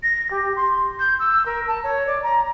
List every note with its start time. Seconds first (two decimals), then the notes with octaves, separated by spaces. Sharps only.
0.02 A#6
0.30 G4
0.56 C6
0.99 G6
1.19 E6
1.45 A#4
1.67 A5
1.83 C#5
2.06 D5
2.23 A#5